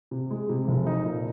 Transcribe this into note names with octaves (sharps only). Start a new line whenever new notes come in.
C3
G#3
C3
F1
D#4
A#2